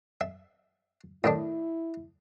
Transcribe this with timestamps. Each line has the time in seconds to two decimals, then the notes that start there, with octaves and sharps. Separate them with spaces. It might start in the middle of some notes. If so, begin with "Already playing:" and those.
0.21 E5
1.24 A2 D#3 D4 E4